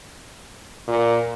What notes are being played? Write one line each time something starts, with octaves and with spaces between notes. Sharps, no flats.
A#2